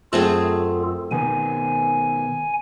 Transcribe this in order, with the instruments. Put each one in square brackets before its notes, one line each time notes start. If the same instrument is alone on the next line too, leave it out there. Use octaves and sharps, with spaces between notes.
[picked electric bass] F#2 [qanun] A3 C4 G#4 [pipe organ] F4 A4
[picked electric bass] B2 D#3 B3 [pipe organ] G#5